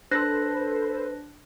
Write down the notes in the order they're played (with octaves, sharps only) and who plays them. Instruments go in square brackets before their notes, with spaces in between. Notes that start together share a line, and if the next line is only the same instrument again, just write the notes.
[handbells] D4 F#6 A#6 [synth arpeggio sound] A4 B4 C5